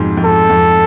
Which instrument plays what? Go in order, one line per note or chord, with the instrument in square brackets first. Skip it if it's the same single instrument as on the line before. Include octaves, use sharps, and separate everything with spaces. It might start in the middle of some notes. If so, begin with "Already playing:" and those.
Already playing: [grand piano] F2 G#2 B2
F2
[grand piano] G#2 [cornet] A4
[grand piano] F2